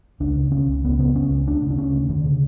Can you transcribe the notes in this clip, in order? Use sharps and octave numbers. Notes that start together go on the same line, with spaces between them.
C#2 D4
C#3
C#3 C#4
C#2
C#2 B3
C#4
C#3 B3
C#3 C#4
C#2
D2 D4
C#3
D4
C#3 C#4
D2
D2 D3
C#3